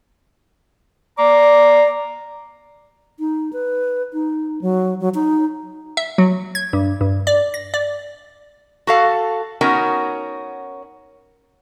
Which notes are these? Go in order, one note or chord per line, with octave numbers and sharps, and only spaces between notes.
D5 A#5 D6
D#4
B4
D#4
F#3
F#3
D#4
E5
F#3
G#6
G2
G2
D5
A#6
D5
F#4 A4 F5
B3 C#4 D#4 F#4 A#4 C#5